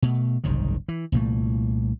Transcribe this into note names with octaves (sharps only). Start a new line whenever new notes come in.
B2 A3
F#1 C2 G#2 D#3
E3
C2 A#2 E3 A3